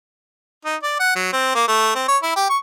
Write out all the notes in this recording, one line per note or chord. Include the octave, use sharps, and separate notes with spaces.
D#4
D5
F#5
F#3
C4
A#3
A3
C4
C#5
E4
G4
C#6